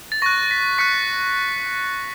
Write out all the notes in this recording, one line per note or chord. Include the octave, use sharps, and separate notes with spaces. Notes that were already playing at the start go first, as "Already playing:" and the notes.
A6
C#6 F#6 A#6
A#6
B6
C#6 F#6 B6 C#7